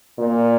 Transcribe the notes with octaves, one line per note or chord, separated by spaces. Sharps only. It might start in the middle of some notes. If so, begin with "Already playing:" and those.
A#2